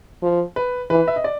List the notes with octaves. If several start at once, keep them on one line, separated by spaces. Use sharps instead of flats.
F3
B4
E3 B4
E5
D#5
D5